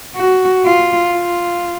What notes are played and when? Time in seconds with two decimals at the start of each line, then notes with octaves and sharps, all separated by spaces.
0.16 F#4
0.65 F4
1.15 F4